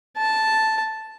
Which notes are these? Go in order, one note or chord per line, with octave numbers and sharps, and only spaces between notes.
A5